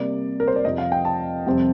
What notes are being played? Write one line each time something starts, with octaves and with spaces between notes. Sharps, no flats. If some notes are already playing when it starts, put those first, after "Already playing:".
Already playing: C3 G3 A#3 D5
A#4
C5
D5
F2 C3 F3 D#5
F5
G5
A5
F2 C3 G3 C4